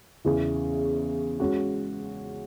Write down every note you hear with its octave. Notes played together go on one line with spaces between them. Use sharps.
E2 C#3 E3
G#3 C#4 F#4